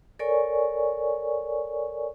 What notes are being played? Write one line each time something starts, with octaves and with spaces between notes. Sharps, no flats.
A4 A#4 C#5 D5 G#5 C#6